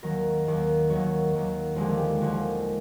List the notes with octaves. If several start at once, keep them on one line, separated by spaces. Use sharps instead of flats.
D#2 D#3 F#3 A#4
D#2 D#3 F#3
D#2 D#3 F#3 C#5
D#2 D#3 F#3
D#2 D3 F3 G#3 G4
G#4
G4
G4
D#2 D3 F3 G#3 F#4